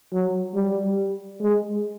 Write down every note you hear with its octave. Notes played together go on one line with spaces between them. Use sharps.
F#3
G3
G#3